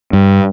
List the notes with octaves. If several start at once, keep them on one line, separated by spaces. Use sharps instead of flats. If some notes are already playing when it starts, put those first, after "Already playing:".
G2